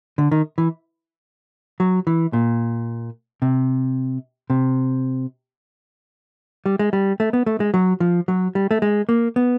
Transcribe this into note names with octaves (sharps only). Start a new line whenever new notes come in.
D3
D#3
E3
F#3
E3
A#2
C3
C3
G3
G#3
G3
A3
B3
A3
G#3
F#3
F3
F#3
G3
A3
G#3
A#3
B3